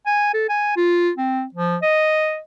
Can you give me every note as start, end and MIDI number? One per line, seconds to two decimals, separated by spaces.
0.06 0.33 80
0.34 0.48 69
0.49 0.73 80
0.76 1.10 65
1.17 1.44 60
1.54 1.77 53
1.82 2.39 75